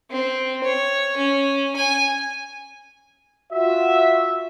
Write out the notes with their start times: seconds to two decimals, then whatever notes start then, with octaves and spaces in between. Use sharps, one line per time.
0.11 C4
0.64 C#5
1.17 C#4
1.77 G#5
3.53 F4 F#4 E5